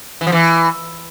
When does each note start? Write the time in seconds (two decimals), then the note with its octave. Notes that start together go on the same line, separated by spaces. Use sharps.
0.21 E3
0.27 F3
0.32 E3